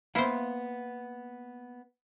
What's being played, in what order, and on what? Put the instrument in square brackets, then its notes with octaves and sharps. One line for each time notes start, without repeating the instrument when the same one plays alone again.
[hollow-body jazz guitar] A#3 B3 F5 [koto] E4 C5